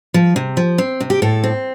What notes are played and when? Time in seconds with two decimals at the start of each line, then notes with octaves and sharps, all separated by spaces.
0.14 F3
0.36 C3
0.57 F3
0.78 C4
1.00 C3
1.10 G4
1.22 A2 A4
1.44 C4